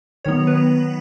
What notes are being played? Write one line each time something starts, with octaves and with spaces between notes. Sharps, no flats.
D#3 F#3 B3 C#5
B4